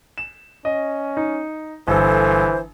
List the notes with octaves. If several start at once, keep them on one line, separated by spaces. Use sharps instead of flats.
E7
C#4 D#5
D#4
G1 E3 A4 C5